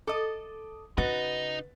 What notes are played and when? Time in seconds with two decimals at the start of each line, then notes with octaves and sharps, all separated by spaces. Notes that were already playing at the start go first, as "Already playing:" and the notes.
0.07 A4 D#5 D6 D#6
0.98 C#3 D#4 F#4 B4 D#5 A6